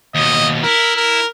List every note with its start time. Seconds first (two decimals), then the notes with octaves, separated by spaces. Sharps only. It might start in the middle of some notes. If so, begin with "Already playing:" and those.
0.15 D#2 B2 D#5
0.63 E4 A#4
0.96 A#4